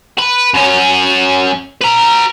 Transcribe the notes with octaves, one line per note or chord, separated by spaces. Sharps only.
B4
F#2 C#4
B4 A#5